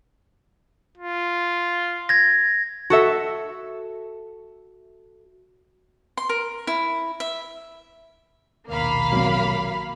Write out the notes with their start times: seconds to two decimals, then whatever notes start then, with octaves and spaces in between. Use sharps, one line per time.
0.97 F4
2.09 G#6 A#6
2.90 F#4 A4 E5
6.17 C6
6.29 A#4
6.67 E4
7.20 E5
8.68 A#1 D#2 B2 A#3 F5 B5
9.12 C2 F#3